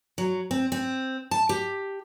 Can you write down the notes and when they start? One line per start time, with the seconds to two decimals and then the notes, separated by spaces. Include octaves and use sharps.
0.18 F#3
0.51 C4
0.72 C4
1.31 A5
1.49 G4